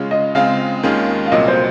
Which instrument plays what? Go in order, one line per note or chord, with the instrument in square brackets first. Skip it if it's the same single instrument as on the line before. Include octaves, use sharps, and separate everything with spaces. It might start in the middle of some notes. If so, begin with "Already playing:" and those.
Already playing: [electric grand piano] C#3 G#3 C#4 F4
[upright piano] D#5
[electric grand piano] C#3 G#3 C4 F4 [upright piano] F5
[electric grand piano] D#2 D#3 G#3 C#4 F4
[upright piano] F5
[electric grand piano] C2 A#2 F#3 C4 [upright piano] D#5
[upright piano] C5